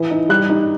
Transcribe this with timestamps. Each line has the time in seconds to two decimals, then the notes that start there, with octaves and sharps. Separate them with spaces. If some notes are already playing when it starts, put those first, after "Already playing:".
Already playing: E3
0.11 D#4
0.29 G3 F#6
0.49 D#4